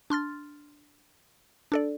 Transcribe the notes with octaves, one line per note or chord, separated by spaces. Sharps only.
D4 C6 F6 A6
D4 A4 D5